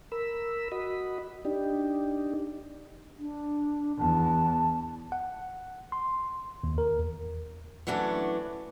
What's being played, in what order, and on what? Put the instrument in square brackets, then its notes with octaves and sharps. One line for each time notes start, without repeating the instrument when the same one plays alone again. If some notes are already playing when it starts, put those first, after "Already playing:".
[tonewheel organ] A#4 B5 E6
F#4 D#5 B5
D4 D#4 G4
[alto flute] D4
[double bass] E2 [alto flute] A5
[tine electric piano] F#5
C6
D#2
A#4
E2
[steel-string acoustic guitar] E3 F#3 A3 C#4 D4